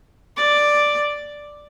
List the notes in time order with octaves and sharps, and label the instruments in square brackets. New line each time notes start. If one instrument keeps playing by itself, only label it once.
[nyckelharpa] D5